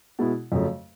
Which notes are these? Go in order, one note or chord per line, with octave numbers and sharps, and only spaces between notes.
B2 G#3 B3 E4
F2 C#3 F#3 A3